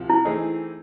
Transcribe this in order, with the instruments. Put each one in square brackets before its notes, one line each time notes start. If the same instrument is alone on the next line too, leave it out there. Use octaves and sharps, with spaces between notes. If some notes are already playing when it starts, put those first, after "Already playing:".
Already playing: [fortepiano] C2 C3 F3
[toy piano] E4
[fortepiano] E3 A3 C4 D#4 G#4